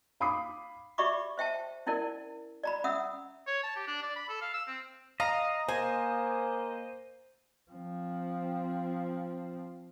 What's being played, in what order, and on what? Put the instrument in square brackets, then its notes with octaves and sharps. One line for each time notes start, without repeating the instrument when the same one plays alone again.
[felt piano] F5 B5 D6 D#6 C7
[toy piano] G4 D5 E5 B5 C#6 D6
C5 E5 G5 A5
C#4 D#4 E4 A#4 D5
D5 A#5 B5
C#4 E5 F#5 D#6 E6
[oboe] C#5
A5
G4
D4
D5
B5
A4
F5
E6
C4
[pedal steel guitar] D#5 [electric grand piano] F5 [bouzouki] A#5
[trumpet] A#3 [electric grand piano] C5 [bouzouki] G#5
[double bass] F3 C4